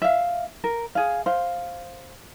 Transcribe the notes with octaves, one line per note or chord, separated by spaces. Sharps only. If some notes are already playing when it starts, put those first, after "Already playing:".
E5 F5
A#4
G#4 F5
C5 F5